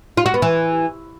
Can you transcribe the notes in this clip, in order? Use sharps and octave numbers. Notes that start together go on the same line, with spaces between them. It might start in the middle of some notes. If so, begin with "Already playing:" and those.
F4
F#4
B3
E3